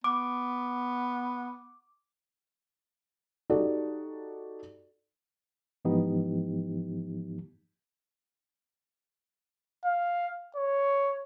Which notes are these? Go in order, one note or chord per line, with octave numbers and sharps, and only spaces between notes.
B3 D6
D#4 F#4 G4 A4 D5
G#2 E3 F3 B3 D#4 G4
F5
C#5